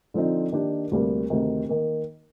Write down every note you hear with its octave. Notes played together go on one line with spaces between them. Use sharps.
D3 F3 C4 D#4
D#3 A#3 D4 G4
D2 C3 G3 A#3
D2 C3 D#3
D#3 A#3